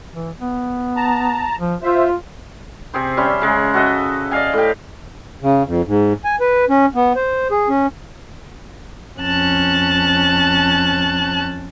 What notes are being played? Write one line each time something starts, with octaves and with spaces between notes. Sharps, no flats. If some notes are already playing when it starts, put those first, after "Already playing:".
E3
B3
A5 A#5
F3
F4 C5 E5
C3 C4 G#4 C5
G3 C#4 E5 C6
C#3 G#3
F#4 A4 D#5 E5
D5 D#5 F5 G#5
A2 G4
C#3
F2
G#2
G#5
B4
C#4
B3
C5
G#4
C#4
F2 C#4 A5 F#6